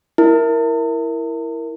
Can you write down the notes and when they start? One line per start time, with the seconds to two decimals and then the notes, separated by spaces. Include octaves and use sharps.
0.18 E4 A#4